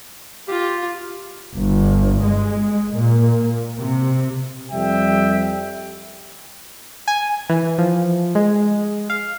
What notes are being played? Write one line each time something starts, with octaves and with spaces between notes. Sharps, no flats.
F4 G4
G1
G#3
A#2
C3
F2 G3 E5 G5
G#5
E3
F3
G#3
F5